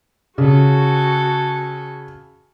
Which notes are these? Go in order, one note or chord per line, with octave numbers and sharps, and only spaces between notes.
C#3 F#4 A4 G#5